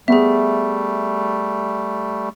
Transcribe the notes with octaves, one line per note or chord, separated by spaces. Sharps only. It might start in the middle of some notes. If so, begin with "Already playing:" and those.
G3 A3 B3 G#4 E5